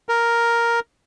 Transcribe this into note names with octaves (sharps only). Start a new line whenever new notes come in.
A#4